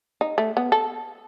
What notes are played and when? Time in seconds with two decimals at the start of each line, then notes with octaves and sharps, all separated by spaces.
0.21 D#4
0.38 A3
0.57 B3
0.72 A4